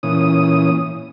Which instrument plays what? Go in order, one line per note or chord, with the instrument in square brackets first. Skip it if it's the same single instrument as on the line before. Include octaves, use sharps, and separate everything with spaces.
[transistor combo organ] A#2 E3 C#4 D#6